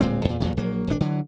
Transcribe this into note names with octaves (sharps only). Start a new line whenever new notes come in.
D1 A#2 G#3 C4
E2 A#2
E2 G2 A#2 F#3
A#1 F#3 A#3
D#1 G#1 C3 D4
D3 E3 F#3